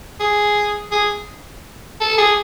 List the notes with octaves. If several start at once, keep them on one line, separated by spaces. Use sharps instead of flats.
G#4
G#4
A4
G#4